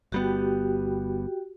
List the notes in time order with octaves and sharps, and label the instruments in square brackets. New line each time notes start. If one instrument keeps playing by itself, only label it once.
[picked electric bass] G1 G3 B3 [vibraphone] F#4 G4 G5